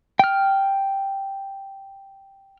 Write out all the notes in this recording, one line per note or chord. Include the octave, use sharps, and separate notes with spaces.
G5 F6